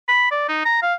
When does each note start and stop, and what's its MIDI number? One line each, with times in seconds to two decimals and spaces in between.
0.08 0.30 83
0.31 0.45 74
0.49 0.63 63
0.65 0.78 82
0.82 0.94 77